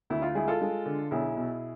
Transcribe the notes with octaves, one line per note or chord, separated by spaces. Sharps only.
D2 E4
F4
G#3 E4 G#4
F4 A4
G#3
D3
B1 E4 G#4
B2